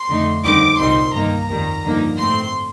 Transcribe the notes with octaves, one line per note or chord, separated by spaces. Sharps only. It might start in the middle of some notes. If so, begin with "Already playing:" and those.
Already playing: C6
F2 D3 A3 D#4
D#2 D3 G3 C4 D#4 D6
C2 A#2 G3 C4 D#4 C6
G2 D#3 A#3 D#4 A#5
F2 D#3 G3
G2 D3 F3 A#3 D#4
A2 A3 C4 C6